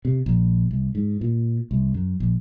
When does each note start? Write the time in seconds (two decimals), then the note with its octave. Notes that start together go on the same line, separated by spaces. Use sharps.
0.05 C3
0.26 A#1
0.71 C2
0.95 G#2
1.21 A#2
1.71 C2
1.94 F#2
2.20 A#1